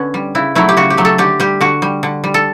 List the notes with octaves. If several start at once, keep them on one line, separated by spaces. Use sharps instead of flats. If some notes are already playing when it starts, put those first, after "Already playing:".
Already playing: D3 B3 C#4
G3
C#3 E4
F#3 A3 E4
G4
C#3 F#4
G4
F#3 A3
A4
D3 G4
G3 G4
D3 F#4
G3
D3
G3
A4